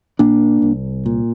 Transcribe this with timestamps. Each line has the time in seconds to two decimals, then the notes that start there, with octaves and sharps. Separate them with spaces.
0.19 A#2 A#3 D4
0.62 C2
1.06 A#2